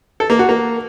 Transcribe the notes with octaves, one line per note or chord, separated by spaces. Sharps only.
A4
A#3
F#4
A#3